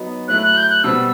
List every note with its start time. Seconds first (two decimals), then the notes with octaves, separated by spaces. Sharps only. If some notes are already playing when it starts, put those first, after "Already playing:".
Already playing: F#3 B3 D#4 F#4
0.28 F#3 A3 E4 F#6
0.42 F#6
0.57 G6
0.70 F#6
0.84 B2 G3 C4 E6